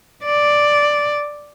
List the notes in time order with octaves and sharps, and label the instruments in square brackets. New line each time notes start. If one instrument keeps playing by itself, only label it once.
[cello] D5